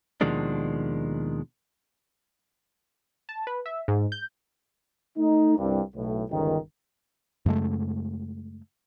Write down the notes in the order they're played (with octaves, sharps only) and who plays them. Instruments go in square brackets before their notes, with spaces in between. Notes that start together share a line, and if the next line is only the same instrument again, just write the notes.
[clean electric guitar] D#2 B2 D#3 F3 G#3 D4
[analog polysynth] A5
B4
E5
G#2
G6
[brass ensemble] A3 D#4
C2 G2
B1 A2
G1 C#2 D#3
[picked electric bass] F#2 C#3 G#3 A3